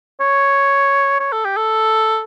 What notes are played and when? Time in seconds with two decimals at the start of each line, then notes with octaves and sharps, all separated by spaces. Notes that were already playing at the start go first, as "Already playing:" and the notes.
0.20 C#5
1.20 C#5
1.32 A4
1.45 G4
1.57 A4